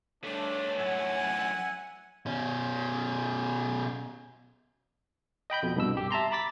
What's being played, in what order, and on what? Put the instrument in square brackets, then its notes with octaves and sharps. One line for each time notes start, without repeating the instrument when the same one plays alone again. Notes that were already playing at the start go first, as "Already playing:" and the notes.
[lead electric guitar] G2 A3 [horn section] D4 [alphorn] C#5
[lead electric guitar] F#2 A2 [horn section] E5 F#5 G#5
[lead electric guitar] B2 C#4
[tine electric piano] D#5 G5 B5 G6
F2 B2
C2 G2 B2 E6
G4
E5 A5 A#5 C6
A#5 B5 D6 A6 B6